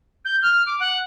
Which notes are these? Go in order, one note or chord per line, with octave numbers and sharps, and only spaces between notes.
G6
F6
D6
F#5